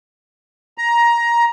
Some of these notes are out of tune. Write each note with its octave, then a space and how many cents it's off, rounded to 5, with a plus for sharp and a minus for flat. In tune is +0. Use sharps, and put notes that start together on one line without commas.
A#5 +15